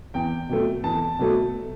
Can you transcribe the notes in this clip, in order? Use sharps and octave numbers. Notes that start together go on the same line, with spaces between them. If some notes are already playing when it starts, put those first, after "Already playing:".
E2 G5
B2 F#3 A3
E2 A5
B2 F#3 A3